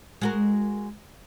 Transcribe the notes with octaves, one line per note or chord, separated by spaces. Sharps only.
G#3 F#4 A#4